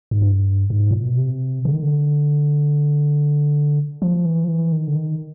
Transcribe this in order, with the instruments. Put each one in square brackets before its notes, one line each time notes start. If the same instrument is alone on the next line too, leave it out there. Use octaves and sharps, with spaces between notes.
[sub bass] G#2
G2
G#2
A#2
B2
C3
D3
D#3
D3
F3
E3
F3
E3
D#3
D3
D#3